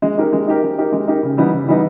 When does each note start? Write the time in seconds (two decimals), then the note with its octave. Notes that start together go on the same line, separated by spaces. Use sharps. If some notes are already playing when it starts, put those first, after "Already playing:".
0.02 G#3
0.18 D#4 G4 A#4
0.33 G#3
0.47 D#4 G4 A#4
0.63 G#3
0.78 D#4 G4 A#4
0.92 G#3
1.07 D#4 G4 A#4
1.23 C#3
1.37 E3 G3 B3 D#4
1.52 C#3
1.67 E3 G3 B3 D#4